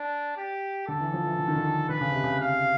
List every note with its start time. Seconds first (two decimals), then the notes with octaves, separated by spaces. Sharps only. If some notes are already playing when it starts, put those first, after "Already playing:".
Already playing: D4
0.37 G4
0.87 D3 A4
1.01 E3
1.14 F3
1.27 E3
1.39 D3
1.48 D#3
1.56 D3
1.89 D3 B4
2.01 C#3
2.12 C3
2.24 C#3
2.41 F5